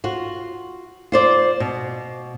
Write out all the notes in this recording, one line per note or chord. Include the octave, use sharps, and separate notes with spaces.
F4 F#4
F4 C5 D5
B2